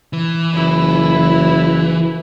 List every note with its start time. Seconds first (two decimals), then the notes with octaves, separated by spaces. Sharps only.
0.13 E3
0.54 F#1 E4